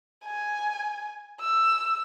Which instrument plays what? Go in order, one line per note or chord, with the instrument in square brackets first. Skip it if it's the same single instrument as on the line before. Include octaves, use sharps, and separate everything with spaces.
[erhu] G#5
E6